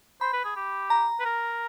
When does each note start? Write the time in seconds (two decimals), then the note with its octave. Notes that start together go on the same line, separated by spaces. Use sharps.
0.21 C5 B5
0.33 B4
0.45 G#4
0.56 G4
0.90 A#5
1.20 B4
1.25 A#4